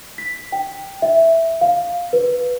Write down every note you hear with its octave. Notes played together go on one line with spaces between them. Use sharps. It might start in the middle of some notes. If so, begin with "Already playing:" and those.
B6
G5
E5
F5
B4